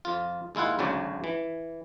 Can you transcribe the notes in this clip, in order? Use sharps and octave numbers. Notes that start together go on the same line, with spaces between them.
F2 F4
D#2 G#3 E4 F4 F#5
G#1 D2 C#3 F#3 D5
E3